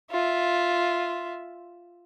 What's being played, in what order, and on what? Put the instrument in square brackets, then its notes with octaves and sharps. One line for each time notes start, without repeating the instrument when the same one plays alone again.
[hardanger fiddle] F4 E5